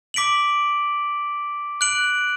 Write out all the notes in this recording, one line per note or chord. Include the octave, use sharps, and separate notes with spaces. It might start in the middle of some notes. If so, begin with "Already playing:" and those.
D6 B6 D7 F#7
F#6 D7 F#7